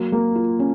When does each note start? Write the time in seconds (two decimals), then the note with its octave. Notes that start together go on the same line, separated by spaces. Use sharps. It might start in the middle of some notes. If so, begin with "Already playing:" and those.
Already playing: F#3 A#3
0.12 A#3
0.36 F4
0.59 C#4